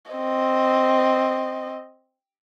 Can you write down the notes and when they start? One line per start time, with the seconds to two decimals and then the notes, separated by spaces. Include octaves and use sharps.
0.11 C4 D#5